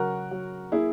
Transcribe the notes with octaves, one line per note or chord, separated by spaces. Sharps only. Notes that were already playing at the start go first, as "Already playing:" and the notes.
Already playing: C#3 F#3 F#4 A#4
F#3
A#3 E4 G#4